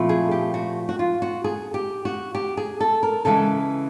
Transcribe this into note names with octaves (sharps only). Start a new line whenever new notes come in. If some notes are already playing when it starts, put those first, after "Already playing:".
Already playing: A#2 F3 A3 C4 E4
G#4
G4
F#4
F#4
F4
F#4
G#4
G4
F#4
G4
G#4
A4
A#4
C#3 E3 G#3 A4